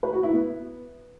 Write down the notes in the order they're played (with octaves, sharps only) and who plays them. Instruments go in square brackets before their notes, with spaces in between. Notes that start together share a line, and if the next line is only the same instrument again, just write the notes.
[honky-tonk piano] B4
F#4
E4
B3